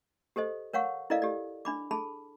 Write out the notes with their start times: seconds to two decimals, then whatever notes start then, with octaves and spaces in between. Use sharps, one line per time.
0.36 G4 A4 C5 D#5
0.73 A#4 C#5 F5 F#5 C#6
1.10 E4 A4 A#4 D5 D#5 F5
1.22 G4 A4 D5
1.65 D4 B5 D6
1.91 G#4 A4 A5 B5